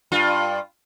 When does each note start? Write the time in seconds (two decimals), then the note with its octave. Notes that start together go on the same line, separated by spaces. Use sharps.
0.12 G2 F4